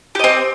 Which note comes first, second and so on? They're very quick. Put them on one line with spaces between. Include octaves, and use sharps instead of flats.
G4 D#5 C4